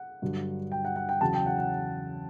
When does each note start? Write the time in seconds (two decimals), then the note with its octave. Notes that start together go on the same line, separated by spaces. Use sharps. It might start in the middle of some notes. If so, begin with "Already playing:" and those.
Already playing: F#5
0.22 G2 D3 F#3
0.72 G5
0.85 F#5
0.96 F#5
1.09 G5
1.21 E2 C#3 F#3 A5
1.34 G5
1.46 F#5
1.58 F#5